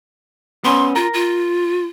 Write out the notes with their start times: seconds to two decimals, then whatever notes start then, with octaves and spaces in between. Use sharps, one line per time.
0.65 B3 C#4 C6
0.96 F4 A#4
1.14 F4